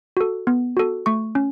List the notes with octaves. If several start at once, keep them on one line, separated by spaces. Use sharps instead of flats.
F#4 A4
B3
F#4 A4
A3 C#6
C#4